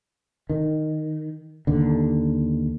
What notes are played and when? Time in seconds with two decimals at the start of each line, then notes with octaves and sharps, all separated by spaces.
0.50 D#3
1.67 D#2 D3